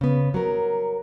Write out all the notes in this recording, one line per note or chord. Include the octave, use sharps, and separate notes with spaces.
C#3 B3
F#3 A#4